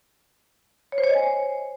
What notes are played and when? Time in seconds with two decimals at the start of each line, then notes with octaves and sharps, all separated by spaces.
0.92 C#5
0.98 C5
1.04 C#5
1.09 D#5
1.15 G#5